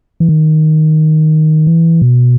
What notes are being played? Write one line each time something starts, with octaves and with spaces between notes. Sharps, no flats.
E3
D#3
E3
B2